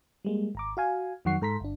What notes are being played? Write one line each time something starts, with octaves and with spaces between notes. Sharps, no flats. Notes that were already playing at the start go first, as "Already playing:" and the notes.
G3 G#3 A#3
G#1 A#5 D6
F#4 F5 G#5
F2 D#3 F#3 F#5 C#6 C7
G#2 A4 A#5 C6 B6
G1 D4